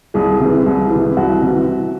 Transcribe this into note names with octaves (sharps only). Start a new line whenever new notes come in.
C2 G#4
C3 E3
C2
E3
C3
C2 F#4
C3 E3